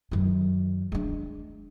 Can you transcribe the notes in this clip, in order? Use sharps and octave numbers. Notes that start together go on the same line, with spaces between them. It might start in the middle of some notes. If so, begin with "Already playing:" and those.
F#2 D#3
G#3 D4